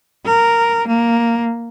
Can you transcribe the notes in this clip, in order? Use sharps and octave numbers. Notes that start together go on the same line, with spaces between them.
A#4
A#3